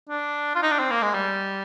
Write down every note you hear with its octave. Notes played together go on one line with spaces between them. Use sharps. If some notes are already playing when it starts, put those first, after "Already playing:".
D4
F4
D#4
D4
C4
A#3
G#3
G3